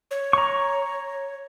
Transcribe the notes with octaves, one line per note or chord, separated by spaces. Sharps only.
C#5
A#5 C#6